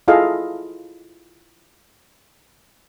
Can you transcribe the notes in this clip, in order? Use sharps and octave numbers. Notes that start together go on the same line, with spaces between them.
E4 F4 G#4 A4 D#5 F5